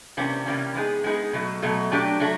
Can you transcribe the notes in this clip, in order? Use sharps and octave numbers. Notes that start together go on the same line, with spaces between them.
C3 E3 G3 A#3 C#4
C3 E3 G3 A#3 C#4
G#3 B3 D#4 G#4
G#3 B3 D#4 G#4
B2 F#3 A3
B2 F#3 A3
F#3 A3 D4 G4
F#3 A3